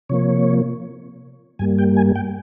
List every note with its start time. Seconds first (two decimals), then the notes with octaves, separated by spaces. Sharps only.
0.09 C3 F3 A#3 C#5
1.59 G2 G3 A#3 G#5
1.78 G5
1.97 G#5
2.16 G5